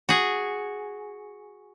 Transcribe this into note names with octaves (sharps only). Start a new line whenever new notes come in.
F#4 G#4